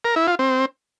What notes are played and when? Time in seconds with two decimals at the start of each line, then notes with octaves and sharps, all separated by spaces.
0.05 A#4
0.16 E4
0.28 F4
0.39 C4